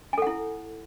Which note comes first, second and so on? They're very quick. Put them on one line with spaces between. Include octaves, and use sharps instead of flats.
G#5 A4 F#5 E4